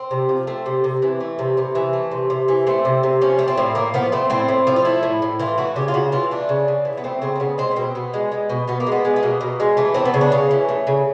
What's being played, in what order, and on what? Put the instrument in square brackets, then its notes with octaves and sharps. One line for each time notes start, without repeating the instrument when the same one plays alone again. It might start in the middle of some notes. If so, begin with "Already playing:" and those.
Already playing: [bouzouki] C4
C3
F3
A3 C4
C3
C3
E3
A3
C3
C3 B3
E3
A3
C3
C3
E3
A3 C4
C3
C3
F3 C#4
A3
C4
A2
A2 A#3
F3 B3
A3 C4
A2 C4
A2
F3
F4
A3 E4
A2
A2
E3 F4
A3 F#4
C#3 G4
F4
C#3 F#4
E3 F4
A3 D4
C#3
C#3
E3
B3
A3 C4
C#3 C4
C4
C#3 B3
G#3 C4
B3
B2 C4
B2 B3
G#3
G#3
B2
B2 B3
A#3
G#3
B3
G#3
A3
B2 A#3
B2
G#3
E3 A3
A3 C4
B3
C#3
D4
C#3 C#4
E3
A3
C#3